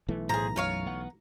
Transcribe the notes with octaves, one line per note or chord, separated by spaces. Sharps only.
B1 E3 A3
A2 F3 G#4 A#5
F#2 F4 C#5 F5
B3 F#5